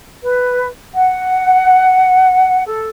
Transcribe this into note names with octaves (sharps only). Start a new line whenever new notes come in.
B4
F#5
A4